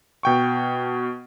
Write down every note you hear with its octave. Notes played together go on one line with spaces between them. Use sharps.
B2 G5 C#6